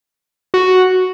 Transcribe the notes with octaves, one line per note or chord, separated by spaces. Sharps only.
F#4